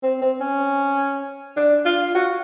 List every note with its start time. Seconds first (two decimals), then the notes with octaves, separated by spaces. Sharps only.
0.03 C4
0.22 C4
0.41 C#4
1.57 D4
1.85 F4
2.15 F#4